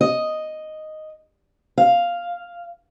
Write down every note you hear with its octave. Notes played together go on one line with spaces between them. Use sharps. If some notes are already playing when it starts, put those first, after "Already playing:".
D#5
F5